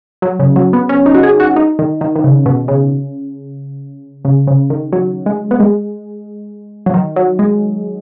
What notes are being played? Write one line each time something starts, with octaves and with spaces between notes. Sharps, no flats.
F#3
C#3
F#3
B3
C#4
D#4
F#4
G#4
F#4
D#4
D#3
D#3
D#3
C#3
B2
C#3
C#3
C#3
D#3
F#3
G#3
B3
G#3
F#3
D#3
F#3
G#3